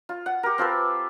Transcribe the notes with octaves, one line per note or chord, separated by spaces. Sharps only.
F4
F#5
G4 A#4
C4 F4 A4 B4